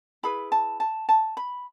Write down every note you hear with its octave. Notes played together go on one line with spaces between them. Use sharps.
E4 G#4 B4 B5
A5
A5
A5
B5